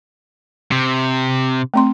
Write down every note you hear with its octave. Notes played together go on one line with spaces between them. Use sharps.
C3
A3 C4 C6